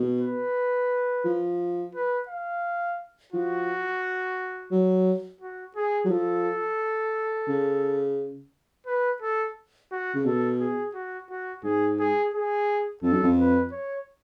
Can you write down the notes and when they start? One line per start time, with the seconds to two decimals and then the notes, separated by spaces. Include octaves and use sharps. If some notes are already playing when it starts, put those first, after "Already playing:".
Already playing: B2
0.21 B4
1.25 F3
1.95 B4
2.28 F5
3.33 F3 F#4
4.72 F#3
5.41 F#4
5.76 G#4
6.05 F#3
6.10 F3 A4
7.48 C#3
8.87 B4
9.22 A4
9.92 F#4
10.15 C#3
10.25 B2 A4
10.60 G#4
10.94 F#4
11.30 F#4
11.64 G#2 G#4
11.99 G#4
12.34 G#4
13.03 F2 A4
13.13 F#2
13.23 F2
13.37 B4
13.72 C#5